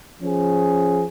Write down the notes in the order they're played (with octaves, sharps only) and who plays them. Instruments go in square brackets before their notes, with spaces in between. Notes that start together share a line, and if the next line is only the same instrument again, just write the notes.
[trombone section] F3 C#4 G#4